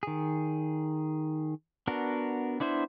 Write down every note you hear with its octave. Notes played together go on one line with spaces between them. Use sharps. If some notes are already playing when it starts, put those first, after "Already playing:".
D#3 G#4
B3 D4 F#4 A#4
B3 D4 E4 C5